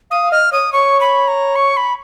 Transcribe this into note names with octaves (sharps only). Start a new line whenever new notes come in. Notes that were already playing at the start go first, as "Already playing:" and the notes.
F5 D#6
F5
D#5 F6
C#5 D#6
C#5 C#6
B5
A#5
C#6
B5